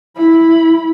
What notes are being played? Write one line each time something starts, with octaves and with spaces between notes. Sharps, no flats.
E4 B5